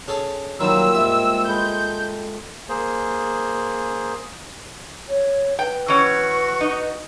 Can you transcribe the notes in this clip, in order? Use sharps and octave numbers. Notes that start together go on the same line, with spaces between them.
C#4 G#4 A4
D#3 F#3 G3 A#3 F4 E6
G#2 G3 G4 E5
G#3 A4 B5 G6
A#3 G#4 C5
C#5
B4 G5
E3 C#4 F#4 C#6
D#4